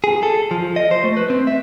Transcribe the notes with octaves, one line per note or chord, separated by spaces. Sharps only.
G#4
A4
F3
D#5
C5
A3
B4
C4
E5